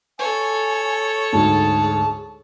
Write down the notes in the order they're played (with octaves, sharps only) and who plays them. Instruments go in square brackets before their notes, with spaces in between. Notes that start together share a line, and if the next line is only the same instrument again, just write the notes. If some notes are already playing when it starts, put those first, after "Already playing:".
[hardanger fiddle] A4 C#5 [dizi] G#5
[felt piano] D2 G#2 [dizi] G#4 [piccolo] A5